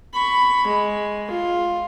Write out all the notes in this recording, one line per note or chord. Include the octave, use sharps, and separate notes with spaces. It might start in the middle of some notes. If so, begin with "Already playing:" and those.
B5 C#6
G#3
F4